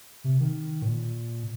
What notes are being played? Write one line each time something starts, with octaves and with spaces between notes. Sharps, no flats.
C3
D#3
A2
A#2